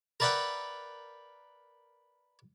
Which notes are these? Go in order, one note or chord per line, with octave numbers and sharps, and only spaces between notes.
A#4 B4 D5 E5 F#5 G5